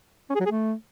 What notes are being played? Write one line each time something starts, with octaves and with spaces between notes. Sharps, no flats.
C#4
G#4
F#3
G#4
A3